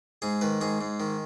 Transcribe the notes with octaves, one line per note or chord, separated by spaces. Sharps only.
G#2 G#4
D#3 B4
G#2 G#4
G#2
D#3